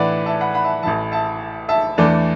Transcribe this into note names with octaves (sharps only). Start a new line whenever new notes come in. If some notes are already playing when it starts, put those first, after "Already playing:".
Already playing: A2 E3 D4 B4 D5 E5 F#5
E5 A5
F#5 B5
F#5 B5
E5 A5
A1 A2 E3 E5 A5
E5 A5
E5 A5
E2 E3 A3 D4